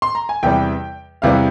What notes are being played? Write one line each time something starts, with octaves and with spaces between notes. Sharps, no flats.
C6
A#5
G#5
E2 C3 E3 G3 G5
E2 C3 E3 G3 F5